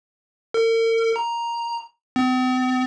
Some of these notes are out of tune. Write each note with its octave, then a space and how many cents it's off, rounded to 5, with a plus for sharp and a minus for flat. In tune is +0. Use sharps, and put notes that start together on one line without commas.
A#4 -45
A#5 +5
C4 -45